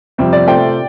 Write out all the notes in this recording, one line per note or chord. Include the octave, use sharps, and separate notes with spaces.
F2 C3 G3 C4 F4
D5
C3 A3 F4 A4 C5 G5